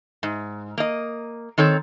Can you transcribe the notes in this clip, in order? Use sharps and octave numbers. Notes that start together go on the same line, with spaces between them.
G#2
A#3 D#5
D#3 C4 A4 C#5